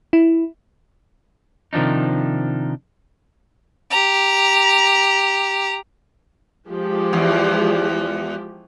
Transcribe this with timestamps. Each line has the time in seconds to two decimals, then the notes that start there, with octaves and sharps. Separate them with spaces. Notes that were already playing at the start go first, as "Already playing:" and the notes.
0.13 E4
1.73 C3 D#3 F3 D4 D#4
3.90 G4 A#5
6.68 F3 G#3 G4
7.13 E2